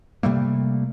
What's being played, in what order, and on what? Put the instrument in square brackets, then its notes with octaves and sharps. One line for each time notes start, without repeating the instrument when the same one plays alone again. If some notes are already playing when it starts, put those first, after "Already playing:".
[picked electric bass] C3 G3 A3 A#3